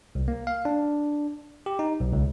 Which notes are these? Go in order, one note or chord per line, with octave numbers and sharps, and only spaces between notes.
C2
A#3
F5
D4
G4
D#4
B1
C#2